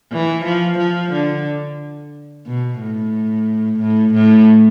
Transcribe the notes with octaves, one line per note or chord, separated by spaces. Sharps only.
E3
F3
F3
D3
B2
A2
A2
A2